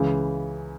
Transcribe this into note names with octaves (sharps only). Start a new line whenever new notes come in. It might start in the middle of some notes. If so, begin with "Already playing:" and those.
Already playing: C#2 C#3 E3